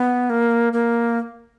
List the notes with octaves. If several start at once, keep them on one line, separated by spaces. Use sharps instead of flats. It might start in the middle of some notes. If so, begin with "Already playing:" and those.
Already playing: B3
A#3
A#3